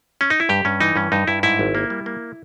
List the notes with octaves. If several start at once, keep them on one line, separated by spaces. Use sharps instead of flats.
C#4
D#4
E4
G2 G4
G2 C#4
E3 D#4
G2 C#4
G2 D#4
G2 E4
G#2 E4
G#1
A#3
G3
A#3